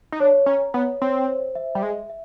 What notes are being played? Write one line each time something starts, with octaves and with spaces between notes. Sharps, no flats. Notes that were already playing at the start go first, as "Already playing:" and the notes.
D#4
D4 C#5
C#4 A#5
B3 C#5
C4 C#5
C5
E5
G3
G#3 E5
E5